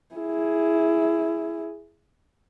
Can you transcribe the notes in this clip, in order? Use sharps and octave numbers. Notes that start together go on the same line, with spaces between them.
E4 G#4